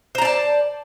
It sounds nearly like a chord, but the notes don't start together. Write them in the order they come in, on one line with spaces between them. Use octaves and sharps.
C5 A#5 D5 A5